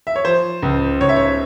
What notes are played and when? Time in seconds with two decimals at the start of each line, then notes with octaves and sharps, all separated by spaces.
0.07 E5
0.16 C#5
0.24 F3 C5
0.63 C#2
1.00 C#2 C#5
1.09 E5
1.16 C#5